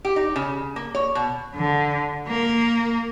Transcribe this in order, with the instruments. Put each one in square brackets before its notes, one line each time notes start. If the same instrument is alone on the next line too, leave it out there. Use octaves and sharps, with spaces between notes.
[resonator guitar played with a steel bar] G4
D#4
C#3
A#3
C#5
B2
[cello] D3
A#3